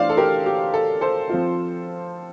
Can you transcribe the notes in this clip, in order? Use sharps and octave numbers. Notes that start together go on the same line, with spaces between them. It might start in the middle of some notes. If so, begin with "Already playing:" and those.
Already playing: E3 A3 D4 F4 C5 D5 F5
A4
G4 A#4
G4
A4
A4 C5
F3 C4 F4